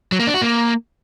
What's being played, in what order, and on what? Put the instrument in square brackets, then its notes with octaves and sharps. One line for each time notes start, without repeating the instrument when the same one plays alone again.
[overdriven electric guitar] F#3
A#3
D4
F#4
A#3